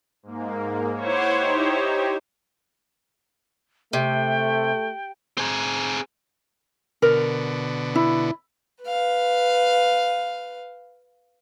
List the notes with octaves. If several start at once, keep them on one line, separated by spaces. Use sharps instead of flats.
G#2 A#3
E4 C5 C#5 F#5 C6 D6
D#4 G4
C3 A3 G5
C4 G#4
B2 D3 A#4
E4
B4 F5